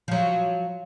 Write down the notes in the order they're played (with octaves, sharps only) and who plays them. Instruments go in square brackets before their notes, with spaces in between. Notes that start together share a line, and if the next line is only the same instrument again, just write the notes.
[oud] F3 F#3